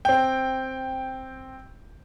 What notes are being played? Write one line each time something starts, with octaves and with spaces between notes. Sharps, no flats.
C4 G5